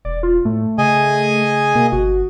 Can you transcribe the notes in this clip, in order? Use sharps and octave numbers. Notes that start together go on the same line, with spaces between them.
E1 D5
F4
A2 A3
C#3 G#4 D#5 G#5
B2 A#3
G1 F#4